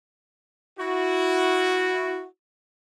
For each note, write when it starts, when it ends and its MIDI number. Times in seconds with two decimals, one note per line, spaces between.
0.79 2.24 64
0.79 2.24 66